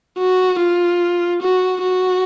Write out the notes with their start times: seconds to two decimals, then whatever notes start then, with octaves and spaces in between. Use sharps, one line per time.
0.19 F#4
0.59 F4
1.42 F#4
1.83 F#4